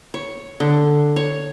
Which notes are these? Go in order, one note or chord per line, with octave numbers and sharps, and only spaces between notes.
C#5
D3
C#5